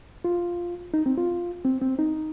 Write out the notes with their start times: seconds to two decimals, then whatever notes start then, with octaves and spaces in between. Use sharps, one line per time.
0.24 F4
0.94 D#4
1.06 C4
1.18 F4
1.65 C4
1.82 C4
1.99 D#4